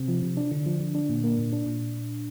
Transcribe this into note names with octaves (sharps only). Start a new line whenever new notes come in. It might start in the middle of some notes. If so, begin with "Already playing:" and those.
Already playing: C3 C4
F3
C3
D4
D3
F3
D3
D4
A#2
A#3
A#2
D4
A#2